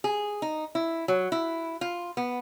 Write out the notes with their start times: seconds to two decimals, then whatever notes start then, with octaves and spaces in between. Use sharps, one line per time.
0.04 G#4
0.42 D#4
0.75 E4
1.08 F#3
1.32 E4
1.81 F4
2.17 B3